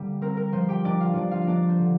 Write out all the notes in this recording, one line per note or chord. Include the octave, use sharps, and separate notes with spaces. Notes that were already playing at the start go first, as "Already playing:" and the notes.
Already playing: D3 G3 A#3 G4
C4 A#4
A#4
F3 C5
G4 G5
A#3 D4 D5
F4 F5
F3 D4 D5
F4 F5
A#3 D4 D5
C5
D3